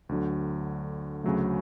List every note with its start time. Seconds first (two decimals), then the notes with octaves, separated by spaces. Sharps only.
0.09 D2 D3 F#3
1.24 D2 C#3 F#3 A3